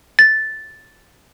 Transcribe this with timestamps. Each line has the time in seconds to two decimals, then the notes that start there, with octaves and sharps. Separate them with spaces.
0.19 A6